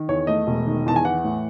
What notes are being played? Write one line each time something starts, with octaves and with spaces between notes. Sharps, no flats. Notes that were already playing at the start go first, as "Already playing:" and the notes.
Already playing: D#3
E2 C#5
A3 D#5
E1
D#3
E2 A5
G#5
E3 F#5
A2